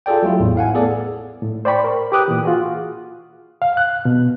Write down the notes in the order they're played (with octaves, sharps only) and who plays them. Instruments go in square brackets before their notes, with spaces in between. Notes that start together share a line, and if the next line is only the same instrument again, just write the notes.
[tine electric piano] F4 G#4 A4 D5 G5
F#3 G3 A3 E4 F4
A1 E2 A2
A2 F5 F#5 G#5
B3 G#4 A4 D5
[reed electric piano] A2
C5 D5 G5 B5 C#6
A#4
G4 B4 D6 D#6 F#6
A#2 E3
F4 F#4 G#4
F5
F#6
B2